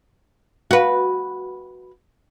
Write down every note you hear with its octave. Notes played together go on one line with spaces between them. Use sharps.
F#4 B4